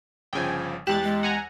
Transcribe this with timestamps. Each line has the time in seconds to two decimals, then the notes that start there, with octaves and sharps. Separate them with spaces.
0.33 G1 C#3 F3 G5 G#5
0.87 E2 G#3 G4 F#6 A6 E7
1.03 G#3
1.23 F#5 G#5 A#5